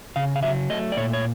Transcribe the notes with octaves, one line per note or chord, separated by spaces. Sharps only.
C#3 F5
F5
F#3 E5
A3 D#5
D5
A#2 C#5
C#5